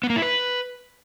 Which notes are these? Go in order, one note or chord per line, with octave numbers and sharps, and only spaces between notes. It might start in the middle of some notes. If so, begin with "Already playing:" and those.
B3
A#3
E4
B4